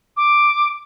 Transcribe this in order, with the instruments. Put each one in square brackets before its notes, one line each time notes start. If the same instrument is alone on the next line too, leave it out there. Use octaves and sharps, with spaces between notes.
[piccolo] D6